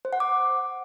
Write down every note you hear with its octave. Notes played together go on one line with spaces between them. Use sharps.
C5
F#5
D6